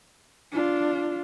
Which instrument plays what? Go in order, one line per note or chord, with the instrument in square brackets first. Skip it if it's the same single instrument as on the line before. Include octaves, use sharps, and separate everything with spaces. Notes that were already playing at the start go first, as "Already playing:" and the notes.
[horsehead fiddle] D4 F4